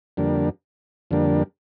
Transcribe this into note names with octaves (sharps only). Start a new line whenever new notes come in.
F2 D3 G3 A#3 D4
F2 D3 G3 A#3 D4